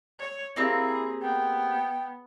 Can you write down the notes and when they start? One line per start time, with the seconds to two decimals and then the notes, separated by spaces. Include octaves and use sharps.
0.19 C#5
0.56 A#3 C4 E4 G4 G#4
1.22 B3 G5